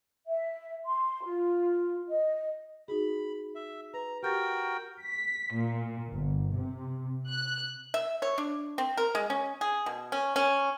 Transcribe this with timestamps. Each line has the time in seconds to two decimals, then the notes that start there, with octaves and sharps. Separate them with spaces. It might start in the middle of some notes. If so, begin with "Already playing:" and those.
0.28 E5
0.85 C6
1.24 F4
2.09 D#5
2.88 D#4 F#4 G#4 B5
3.55 E5
3.94 B4 A#5
4.23 F#4 G4 A#4 G5 G6 A6
5.02 B6
5.53 A#2
6.13 G1
6.55 C3
7.27 F#6
7.94 E5
8.22 C#5
8.38 D4
8.78 C4
8.97 A#4
9.15 G#3
9.30 C#4
9.61 G#4
9.86 B2
10.12 C#4
10.36 C#4